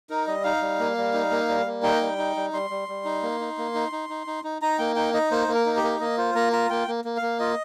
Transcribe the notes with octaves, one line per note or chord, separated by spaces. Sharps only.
D#4 A#4
G3 D#5
D#4 F5
G3
A#3
G3
D#4
A#3
G3
A#3
D#4 G5
G3
D#4
G3
G3 C6
G3
G3
D#4
A#3
D#4
A#3
D#4
D#4
D#4
D#4
D#4
D#4 A#5
A#3 G5
D#4 G5
D#4 D#5
A#3 C5
A#3
A#4
D#4
G4
A#3
A#3 D#5
F4 C5
A#3 A#5
F4 A#5
A#3 G5
A#3
A#3
A#3 F5
F4 D#5